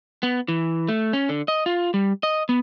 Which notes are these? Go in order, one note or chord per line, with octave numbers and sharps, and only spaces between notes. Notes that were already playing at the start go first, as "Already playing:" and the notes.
B3
E3
A3
C#4
D3
D#5
F4
G3
D#5
B3